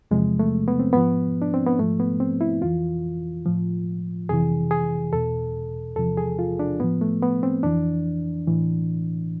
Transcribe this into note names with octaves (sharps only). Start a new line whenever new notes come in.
E2 C3 F3 G#3
A3
B3
C4
G#2 F3 B3
D4
C4
B3
G#2 F3 A3
B3
C4
E4
F2 E3 F4
A2 F3
F2 C3 E3 G#4
G#4
E2 B2 A4
E2 C3 F3 A4
G#4
F4
D4
A2 F3 B3
A3
B3
C4
F2 E3 D4
A2 E3